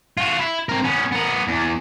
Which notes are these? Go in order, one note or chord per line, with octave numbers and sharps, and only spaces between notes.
F4 F#4
E4
C4 A#4
B3 C#4
B3 A#4
E2